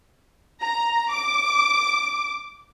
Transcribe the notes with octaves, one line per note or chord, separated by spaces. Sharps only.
A#5
D6